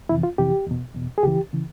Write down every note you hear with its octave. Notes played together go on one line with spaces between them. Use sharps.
F2 C3 E3 E4
F4
F2 C3 E3 G4
E2 B2
E2 B2
G#4
C#2 C#3 E3 G4
C#3 E3